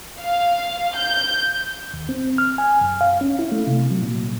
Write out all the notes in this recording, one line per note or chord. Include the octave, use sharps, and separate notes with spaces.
F5
G6
D#2
C4
F6
G#5
F#2
F5
C#4
E4
A3
C3
F#3
A#2